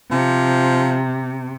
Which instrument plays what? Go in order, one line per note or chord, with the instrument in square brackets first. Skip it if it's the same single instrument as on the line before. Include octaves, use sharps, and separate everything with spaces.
[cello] C3 [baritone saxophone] F3